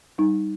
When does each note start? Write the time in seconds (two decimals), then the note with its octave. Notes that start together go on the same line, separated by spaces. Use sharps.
0.18 G3 D#4